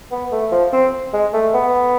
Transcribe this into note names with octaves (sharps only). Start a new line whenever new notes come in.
B3
A3
F3
C4
G#3
A3
B3